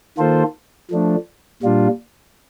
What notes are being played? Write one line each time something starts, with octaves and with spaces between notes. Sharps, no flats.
D#3 A#3 F4 A4 C5
F3 A3 D4
A#2 G3 D4 F4